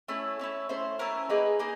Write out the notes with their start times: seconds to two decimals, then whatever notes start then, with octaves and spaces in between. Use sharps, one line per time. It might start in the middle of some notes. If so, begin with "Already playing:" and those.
0.08 A3 C#4 E4 C#5
0.39 A3 C#4 E4
0.69 A3 C#4 E4 C5
0.99 A3 C#4 E4 A#4
1.29 A#3 D#4 G#4 B4
1.59 A#3 D#4 G#4